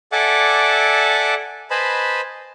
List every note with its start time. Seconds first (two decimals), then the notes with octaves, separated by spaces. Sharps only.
0.12 A4 D5 E5 F#5 G#5 D6
1.70 B4 C5 D#5 G#5 A5 B5